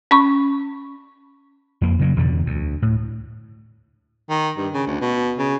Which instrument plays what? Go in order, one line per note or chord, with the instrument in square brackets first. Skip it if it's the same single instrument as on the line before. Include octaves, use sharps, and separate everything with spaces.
[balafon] C#4 B5 C#6
[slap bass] F2 A#3
C#3 F#3 A#3
E2 G2 B2 D3
D2
A2
[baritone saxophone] D#3
G2
C#3
D2
B2
C#3